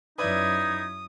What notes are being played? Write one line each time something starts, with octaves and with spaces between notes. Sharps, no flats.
F#2 D#4 E4 B4 D5 E5 D#6 G#6